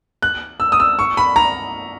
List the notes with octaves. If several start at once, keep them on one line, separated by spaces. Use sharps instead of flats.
F#6
E6
D#6
E6
C#6
B5
A#5